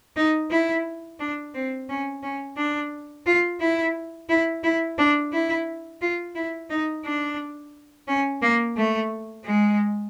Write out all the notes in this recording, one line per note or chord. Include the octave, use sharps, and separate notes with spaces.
D#4
E4
D4
C4
C#4
C#4
D4
F4
E4
E4
E4
D4
E4
F4
E4
D#4
D4
C#4
A#3
A3
G#3